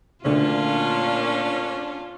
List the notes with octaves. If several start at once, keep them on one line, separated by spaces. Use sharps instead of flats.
D2 A#2 D3 C#4 D4 F4